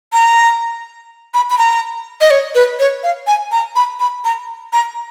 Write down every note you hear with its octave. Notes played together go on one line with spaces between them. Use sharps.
A#5
B5
B5
A#5
D#5
C#5
B4
C#5
F5
G#5
A#5
B5
B5
A#5
A#5